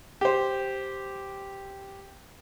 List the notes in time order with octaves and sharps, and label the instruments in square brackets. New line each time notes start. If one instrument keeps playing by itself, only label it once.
[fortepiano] G4 C5